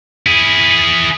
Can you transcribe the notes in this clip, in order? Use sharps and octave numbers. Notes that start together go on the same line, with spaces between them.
E4 G#4